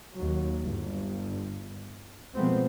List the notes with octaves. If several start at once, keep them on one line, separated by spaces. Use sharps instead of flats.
D#2 F#3
G1 G2
B2 F3 G#3 A3 B3 C4